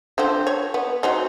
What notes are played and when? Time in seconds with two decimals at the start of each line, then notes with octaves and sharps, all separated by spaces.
0.18 D3 F3 C4
0.47 C#5
0.74 B3
1.03 F#3 C4 D#4